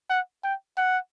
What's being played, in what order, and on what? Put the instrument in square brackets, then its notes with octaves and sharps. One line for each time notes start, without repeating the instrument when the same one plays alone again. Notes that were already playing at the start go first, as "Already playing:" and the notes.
[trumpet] F#5
G5
F#5